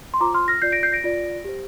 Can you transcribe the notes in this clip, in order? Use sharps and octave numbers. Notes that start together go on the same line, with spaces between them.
C6
F4 C5 A#5 D6
C6 F6
F6 A#6
F4 D5 G6 C7
A#6 D7
G6 C7
A#6 D7
F4 D5
G4 C5